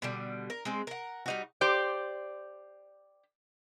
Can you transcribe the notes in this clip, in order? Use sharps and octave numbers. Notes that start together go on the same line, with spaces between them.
B2 D3 G3
A#4
G#3 C4
A#4 F#5
G3 D#4 F#4
G4 C5 D5